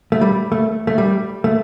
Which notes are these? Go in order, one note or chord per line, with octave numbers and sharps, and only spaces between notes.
A3
G3
A3
A3
G3
A3